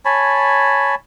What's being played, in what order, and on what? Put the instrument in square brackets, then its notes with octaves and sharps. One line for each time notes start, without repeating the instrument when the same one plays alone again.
[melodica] C#5 G#5 A5 B5